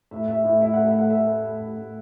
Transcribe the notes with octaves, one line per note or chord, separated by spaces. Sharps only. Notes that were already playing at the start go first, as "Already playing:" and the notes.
A2 E5
A2 E5
A2 E4
A2 E4
F#5
A3
E5
A3 F#5
A3 E5
A3
A3
A2
A2